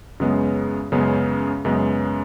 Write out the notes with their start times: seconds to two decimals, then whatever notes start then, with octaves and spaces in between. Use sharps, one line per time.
0.20 F#2 C#3 G#3 B3
0.92 F#2 C#3 G#3 B3
1.65 F#2 C#3 G#3 B3